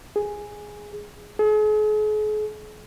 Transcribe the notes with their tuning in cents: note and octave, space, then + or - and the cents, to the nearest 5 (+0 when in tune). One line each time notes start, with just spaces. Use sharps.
G#4 +0
G#4 +45